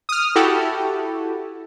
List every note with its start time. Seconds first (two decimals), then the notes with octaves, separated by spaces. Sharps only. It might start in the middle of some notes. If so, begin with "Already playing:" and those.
0.09 D#6 F6
0.35 E4 F#4 G4 A4